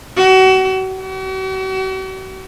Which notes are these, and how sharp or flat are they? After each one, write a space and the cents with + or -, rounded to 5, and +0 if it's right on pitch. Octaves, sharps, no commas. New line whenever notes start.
F#4 +35
F#4 +45